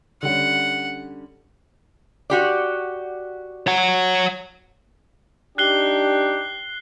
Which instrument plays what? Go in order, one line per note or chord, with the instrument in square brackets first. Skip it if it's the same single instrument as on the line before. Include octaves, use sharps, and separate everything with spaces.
[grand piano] D3 G3 C#4 [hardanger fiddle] F#5
[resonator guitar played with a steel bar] F#4 G4 D5
[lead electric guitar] C#5 F#5
[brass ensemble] D4 D#4 G4 [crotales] F#6 C7 G7